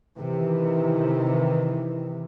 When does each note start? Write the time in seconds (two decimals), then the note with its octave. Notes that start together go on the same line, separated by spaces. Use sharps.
0.19 C3 D#3 E3